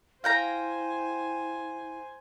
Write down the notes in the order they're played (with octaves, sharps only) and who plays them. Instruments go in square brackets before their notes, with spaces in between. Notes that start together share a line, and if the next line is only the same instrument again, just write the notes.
[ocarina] E4 [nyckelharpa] C5 G#5 [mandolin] F5 G5 A#5